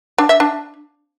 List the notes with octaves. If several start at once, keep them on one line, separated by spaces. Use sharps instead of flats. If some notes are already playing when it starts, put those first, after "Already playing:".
D4
E5
D4